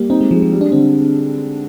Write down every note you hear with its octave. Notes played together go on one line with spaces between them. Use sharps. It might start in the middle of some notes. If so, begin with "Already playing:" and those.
Already playing: G3 A#3
C4 D#4
G#3
F3 G#3
F3
G3
D4
D3 C4